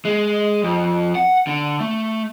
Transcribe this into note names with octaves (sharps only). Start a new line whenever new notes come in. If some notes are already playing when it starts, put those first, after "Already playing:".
G#3
F2
F#5
D3
A3